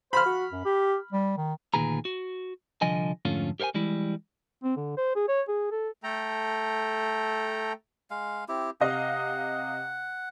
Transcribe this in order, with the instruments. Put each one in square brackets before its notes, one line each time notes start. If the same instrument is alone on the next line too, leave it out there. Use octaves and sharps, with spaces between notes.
[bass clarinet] C5 [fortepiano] B5 F6
[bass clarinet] F#4
F#2
G4
G3
D#3
[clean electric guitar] D2 A#2 D#3 G#4 B4 A#5
F#4
C2 D3 F3 D#5 G#5
F2 G#2 D3 A3 C#4 F4
G4 A#4 C5 F5 G#5
E3 G3 G#3 E4
[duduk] C4
D3
C5
G#4
C#5
G#4
A4
[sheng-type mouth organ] A3 A4 G5 A#5
[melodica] G#3 F5
C4 E4 G4
[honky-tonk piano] C3 D#5 F5 [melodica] F#5